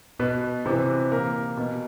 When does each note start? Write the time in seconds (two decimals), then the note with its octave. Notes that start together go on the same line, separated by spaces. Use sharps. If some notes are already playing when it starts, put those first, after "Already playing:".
0.19 B2 B4
0.66 C3 E3
1.12 A#2 A#4
1.57 B2